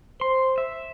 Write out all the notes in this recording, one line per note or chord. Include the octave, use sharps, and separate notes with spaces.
C5 C6
E5